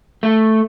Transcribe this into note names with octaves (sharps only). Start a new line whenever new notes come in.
A3